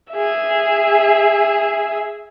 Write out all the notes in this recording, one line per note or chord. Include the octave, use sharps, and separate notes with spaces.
G#4 E5